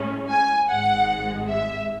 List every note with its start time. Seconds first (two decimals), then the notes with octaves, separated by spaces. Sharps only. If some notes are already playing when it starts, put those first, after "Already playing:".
Already playing: A2 G#3 C#4
0.30 G#5
0.69 G#1 G#2 G#3 F#5
1.47 E5